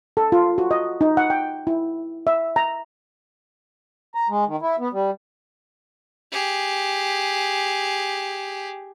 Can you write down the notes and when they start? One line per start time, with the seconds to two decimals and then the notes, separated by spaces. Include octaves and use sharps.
0.17 A4
0.32 F4
0.58 F#4
0.71 D#5
1.01 D#4
1.17 F#5
1.30 G5
1.67 E4
2.27 E5
2.56 A#5
4.15 A#5
4.29 G#3
4.47 D#3
4.61 E4
4.79 B3
4.93 G3
6.32 G4 G#4